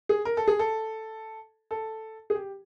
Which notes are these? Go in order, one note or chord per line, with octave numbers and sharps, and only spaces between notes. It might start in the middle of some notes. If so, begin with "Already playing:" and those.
G#4
A#4
A4
G#4
A4
A4
G#4
G4